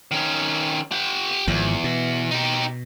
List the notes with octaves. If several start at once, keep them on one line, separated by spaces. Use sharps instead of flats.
D#3 C#4
G4 F#5
G#1 E2 G#2 F3
B2
D#4 G4